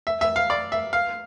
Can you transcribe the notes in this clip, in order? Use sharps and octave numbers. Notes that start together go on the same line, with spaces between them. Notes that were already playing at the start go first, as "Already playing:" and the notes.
E5
E5
F5
D5
E5
F5